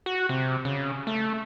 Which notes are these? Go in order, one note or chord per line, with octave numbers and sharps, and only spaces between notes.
F#4
C3
C#3
A3